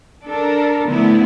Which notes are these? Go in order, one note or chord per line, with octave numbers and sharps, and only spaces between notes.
D4 A4 A#4
D3 F3 A3 B3 E4